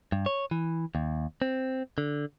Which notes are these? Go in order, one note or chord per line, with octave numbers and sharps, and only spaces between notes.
G2
C#5
E3
D#2
C4
D3